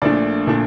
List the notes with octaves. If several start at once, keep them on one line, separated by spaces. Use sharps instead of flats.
A#1 A#2 A3 D4 D5
A#2 A3 D4